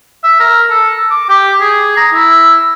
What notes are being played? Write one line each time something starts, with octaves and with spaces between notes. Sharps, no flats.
E5
A#4
A4
D6
G4
G#4
A#5
E4